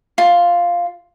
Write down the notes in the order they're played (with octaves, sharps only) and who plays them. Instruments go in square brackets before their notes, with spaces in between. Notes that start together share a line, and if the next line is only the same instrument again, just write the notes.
[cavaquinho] F4